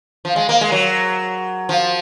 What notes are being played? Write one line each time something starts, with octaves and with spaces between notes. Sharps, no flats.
F3
G#3
A#3
G#3
F#3
F3